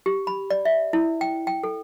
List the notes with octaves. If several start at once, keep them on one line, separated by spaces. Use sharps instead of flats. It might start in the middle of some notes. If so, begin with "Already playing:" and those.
G4
B5
D5
E5
E4
G5
G5
A4